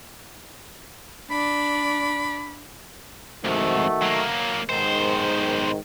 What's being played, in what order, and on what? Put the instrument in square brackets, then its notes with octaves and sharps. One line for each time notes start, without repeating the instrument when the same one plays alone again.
[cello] D4 D5 [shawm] B5
[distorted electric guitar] F2 G#2 [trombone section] D#3 A3 F#4
[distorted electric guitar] F#3 A#3
[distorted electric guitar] B1 C5 [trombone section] G#2 D#3